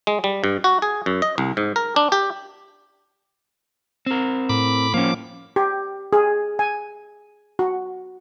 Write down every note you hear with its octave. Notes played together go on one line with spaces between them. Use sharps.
G#3
G3
G2
F#4
G#4
F#2
D#5
C2
G#2
A#4
D4
G4
C4 A#4
A2 B5 D6
F3 A#3 C#4 D6
G4
G#4
G#5
F#4